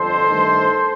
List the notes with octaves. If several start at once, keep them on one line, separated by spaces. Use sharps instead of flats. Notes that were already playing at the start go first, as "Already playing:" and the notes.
Already playing: G1 F2 A4 C5
G2 D#3 A3